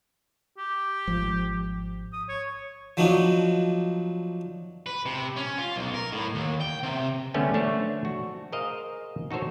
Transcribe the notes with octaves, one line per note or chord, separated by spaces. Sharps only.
G4
G#1 F3
D#6
C#5
F3 F#3 B3 D4 D#4
B4
C3
C#4
F4
B1
A#4
A2
D#2
G5
C3
D3 G3 A3 B3 C#4
A3 D4 C5 C#5
F#4
G#4 A#4 C5 D#5 F5
D#4 F#4 A4 C5 C#5